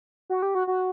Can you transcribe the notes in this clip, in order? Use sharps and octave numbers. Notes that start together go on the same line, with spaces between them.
F#4
G4
F#4
F#4